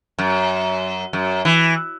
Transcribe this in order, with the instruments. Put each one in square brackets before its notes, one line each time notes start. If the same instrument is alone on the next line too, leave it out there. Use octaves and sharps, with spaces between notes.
[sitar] F#2
F#2
E3